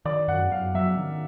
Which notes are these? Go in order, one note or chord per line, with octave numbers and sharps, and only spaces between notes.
D#3 D5
F#2 F#5
F#2 F5
F#3 E5
D#3